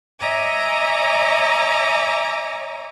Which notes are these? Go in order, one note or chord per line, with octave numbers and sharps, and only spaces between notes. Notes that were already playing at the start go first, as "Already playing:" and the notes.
C#5 D#5 E5 G#5 A#5 D6